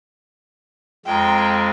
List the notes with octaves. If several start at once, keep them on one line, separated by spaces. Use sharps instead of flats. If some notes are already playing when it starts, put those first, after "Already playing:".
F2 G#3 G5 A#5